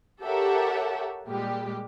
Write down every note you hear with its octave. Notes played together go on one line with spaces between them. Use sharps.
G4 A4 A#4 C#5 E5 F#5
A#2 G3 G#3 G4